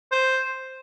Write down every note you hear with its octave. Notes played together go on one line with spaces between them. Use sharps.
C5